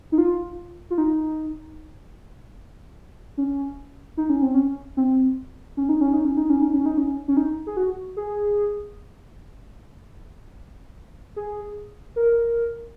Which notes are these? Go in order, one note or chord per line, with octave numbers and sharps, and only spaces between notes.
D#4
F4
F4
D#4
C#4
D#4
C#4
C4
C#4
C4
C#4
D#4
C#4
D#4
C#4
D#4
C#4
D#4
C#4
D#4
C#4
C#4
D#4
G#4
F#4
G#4
G#4
A#4